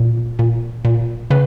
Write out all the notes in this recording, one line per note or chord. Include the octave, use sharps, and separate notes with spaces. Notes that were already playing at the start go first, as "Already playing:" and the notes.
Already playing: A#2
A#2
A#2
C#3 B4